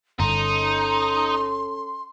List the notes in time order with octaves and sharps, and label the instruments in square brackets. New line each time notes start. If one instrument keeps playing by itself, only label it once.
[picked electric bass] G1 [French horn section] C#4 A4 [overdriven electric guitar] D#4 [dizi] C6